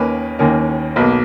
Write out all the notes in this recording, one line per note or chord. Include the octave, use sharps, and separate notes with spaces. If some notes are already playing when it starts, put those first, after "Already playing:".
Already playing: D#2 D#3 A#3 C#4 B4
D#2 D#3 A#3 C#4
B1 B2 A#3 B4